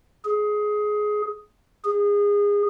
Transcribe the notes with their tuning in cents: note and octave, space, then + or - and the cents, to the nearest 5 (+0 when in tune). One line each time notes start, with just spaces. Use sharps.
G#4 +15
G#4 -25